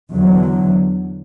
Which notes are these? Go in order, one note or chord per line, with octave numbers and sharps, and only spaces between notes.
E2 D3 F#3